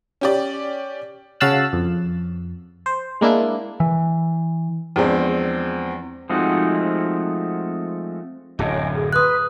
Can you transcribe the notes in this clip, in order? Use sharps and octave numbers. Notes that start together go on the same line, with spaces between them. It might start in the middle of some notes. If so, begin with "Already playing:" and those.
C#4 G4 D5
C#3 F#4 F5 A5 E6 F#6
F2
C5
G#3 A#3 D4 E4
E3
E2 F3 G#3 C4 D4
F3 G#3 A3 C4 D#4 F#4
D1 F#2 C#4 D#5 G5
G#4
B4 C6 D#6 F#6